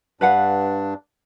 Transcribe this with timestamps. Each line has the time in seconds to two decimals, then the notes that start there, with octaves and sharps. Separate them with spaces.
0.21 G2 D4 B4 F5 F#5